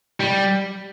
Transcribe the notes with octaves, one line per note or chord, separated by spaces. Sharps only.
G3